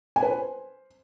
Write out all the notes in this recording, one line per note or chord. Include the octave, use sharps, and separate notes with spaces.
G#5
B4
C5